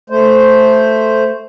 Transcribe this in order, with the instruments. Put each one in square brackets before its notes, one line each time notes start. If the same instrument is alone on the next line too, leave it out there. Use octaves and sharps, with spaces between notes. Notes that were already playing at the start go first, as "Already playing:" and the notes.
[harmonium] A3 C5